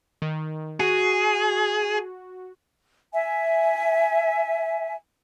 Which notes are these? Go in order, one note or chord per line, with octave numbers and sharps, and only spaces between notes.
D#3
F#4 G#4
E5 G#5